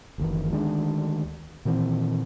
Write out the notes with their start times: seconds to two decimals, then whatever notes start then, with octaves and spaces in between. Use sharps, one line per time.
0.18 F#1 D2 D#3 E3
0.51 D2 D#3 G#3 D4
1.65 A#2 D#3 E3 C4